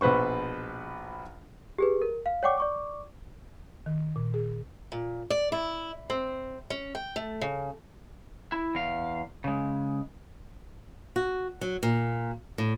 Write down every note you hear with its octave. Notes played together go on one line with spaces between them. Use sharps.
A#1 B2 B4 C5 C#6
G4 G#4 B4
A#4
F5
C#5 D5 F#5 G5 C#6 D6
D5 C#6 D6
D#3
A#2
G#4
A#2
D5
E4
C4
C#4
G5
A3
C#3
E4
E2 F5
C#3 G#3
F#4
F#3
A#2
A2